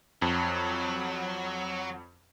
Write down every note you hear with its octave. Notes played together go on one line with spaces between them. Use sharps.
F2 F#3